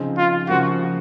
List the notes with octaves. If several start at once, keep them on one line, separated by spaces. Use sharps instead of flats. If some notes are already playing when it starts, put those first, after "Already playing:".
Already playing: C#3 F3 C4 D#4 G#4
F4
C#3 F3 A#3 F#4